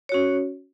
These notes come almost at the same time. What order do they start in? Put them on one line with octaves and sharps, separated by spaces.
C#5 F#4 C#4